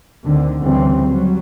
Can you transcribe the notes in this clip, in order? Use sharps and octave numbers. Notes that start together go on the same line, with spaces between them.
D2 D3 D#3 C4
D2 C#3 E3 G3 C4
F#3 G3